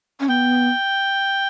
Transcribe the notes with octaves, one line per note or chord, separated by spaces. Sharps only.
C#4
B3 G5